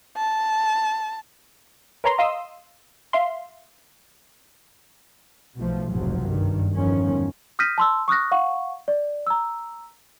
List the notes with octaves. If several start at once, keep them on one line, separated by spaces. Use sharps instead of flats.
A5
A#4 B4 C#5 A#5 C6
D#5 F5 C6 D#6 E6
E5 F5 C6
B1 B2 F3 A3
F1 B1 G#2 C3 F3 F#3
F#1 G2 D#3
G1 E2 G2 D#3 F3 C#4
D#6 F6 G6 A#6 B6 D#7
A5 C6 E6
C#6 D#6 F6 F#6 A#6
F5 F#5 C#6
D5
A#5 E6